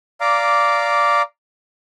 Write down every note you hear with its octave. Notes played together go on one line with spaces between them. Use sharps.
D5 F5 A#5 D6